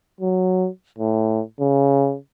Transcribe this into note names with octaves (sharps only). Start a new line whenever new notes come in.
F#3
A2
C#3